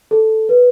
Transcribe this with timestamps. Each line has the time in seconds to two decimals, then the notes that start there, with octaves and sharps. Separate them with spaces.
0.11 A4
0.49 B4